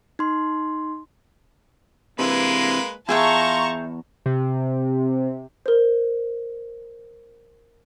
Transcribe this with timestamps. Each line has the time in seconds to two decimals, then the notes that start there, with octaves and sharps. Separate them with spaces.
0.19 D#4 C6
2.19 C3 E3 G#3 A#3 B4
3.09 E2 F4 G#4 E5 G5 A5 A#5 C#6
4.26 C3
5.66 A#4 C5